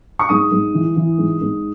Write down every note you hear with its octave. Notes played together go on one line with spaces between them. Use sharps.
C#6
G#2 D#6
G#2
E3
E3
G#2
G#2